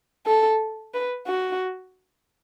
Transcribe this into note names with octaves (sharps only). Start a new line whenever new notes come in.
A4
B4
F#4